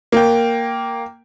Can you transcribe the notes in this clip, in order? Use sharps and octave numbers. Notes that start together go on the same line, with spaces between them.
A#3 G5